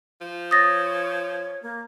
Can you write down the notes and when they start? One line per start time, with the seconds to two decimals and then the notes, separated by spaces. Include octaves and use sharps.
0.21 F3
0.51 C#5 D#6 A6 A#6
1.62 A#3